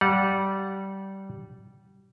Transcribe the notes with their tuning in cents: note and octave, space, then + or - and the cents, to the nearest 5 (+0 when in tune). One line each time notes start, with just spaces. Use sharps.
G3 -20 F#5 -25